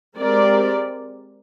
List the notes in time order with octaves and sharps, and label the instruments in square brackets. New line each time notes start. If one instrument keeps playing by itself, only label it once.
[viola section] G#3 C4 G4 A#4 D5